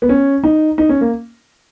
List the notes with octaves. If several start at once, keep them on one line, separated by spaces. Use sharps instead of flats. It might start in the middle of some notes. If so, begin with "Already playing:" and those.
B3
C#4
D#4
D#4
C#4
A#3